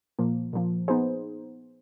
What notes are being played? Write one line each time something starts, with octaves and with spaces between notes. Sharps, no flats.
A#2 F3 A#3
A#2 F3 A#3
B3 D#4 G#4 C5